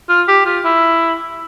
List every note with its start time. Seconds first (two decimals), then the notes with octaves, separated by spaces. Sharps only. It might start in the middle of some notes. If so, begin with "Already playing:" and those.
0.09 F4
0.28 G4
0.45 F4
0.64 E4